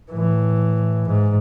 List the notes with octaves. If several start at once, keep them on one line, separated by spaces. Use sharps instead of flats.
A2 E3
G#2